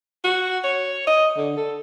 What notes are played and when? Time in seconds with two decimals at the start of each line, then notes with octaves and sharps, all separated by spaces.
0.24 F#4
0.64 C#5
1.07 D#5
1.37 D3
1.57 A4